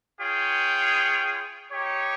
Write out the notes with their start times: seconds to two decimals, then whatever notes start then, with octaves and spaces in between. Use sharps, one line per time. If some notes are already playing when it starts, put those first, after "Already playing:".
0.20 F4 G#4 C#5 G5
1.71 D#4 G4 C#5